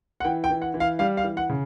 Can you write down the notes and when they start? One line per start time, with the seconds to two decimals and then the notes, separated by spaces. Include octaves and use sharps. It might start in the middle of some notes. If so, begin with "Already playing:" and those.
0.20 F#5
0.24 E3 G5
0.44 G5
0.50 E3
0.62 F#5
0.74 E3
0.80 F5
0.99 G3 F5
1.17 F5
1.24 E3
1.37 F#5
1.49 C#3